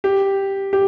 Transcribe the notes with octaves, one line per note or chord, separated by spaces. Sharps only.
G4
G4